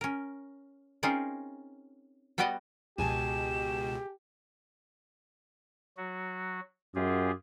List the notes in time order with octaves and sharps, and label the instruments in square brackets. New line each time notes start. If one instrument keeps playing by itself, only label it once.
[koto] C#4 A#4
C4 C#4 D#4 F4 G#4 A#4
G3 B3 F#4 G4 D5 D#5
[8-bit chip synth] C#2 B2 [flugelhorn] G4 [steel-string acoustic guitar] G#4 G#5 A5 [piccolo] E7
[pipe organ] F#3 F#4
[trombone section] F#2 [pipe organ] F4 G4 G#4